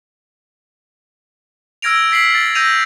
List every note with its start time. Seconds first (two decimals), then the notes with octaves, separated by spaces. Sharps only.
1.82 E6 F6 G#6 A#6 D7 F7
2.12 G#6 B6 C7 D7 F#7
2.35 A6
2.55 E6 G6 A#6 D#7 F7